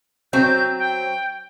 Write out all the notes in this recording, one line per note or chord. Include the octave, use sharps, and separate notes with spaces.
F#3 C4 G6
G5